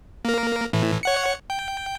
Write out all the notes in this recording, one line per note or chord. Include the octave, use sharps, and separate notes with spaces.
A#3 A#4
A2 E3
C#5 F#5 C#7
G5